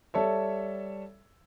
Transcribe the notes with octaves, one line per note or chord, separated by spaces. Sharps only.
G3 A4 C#5 E5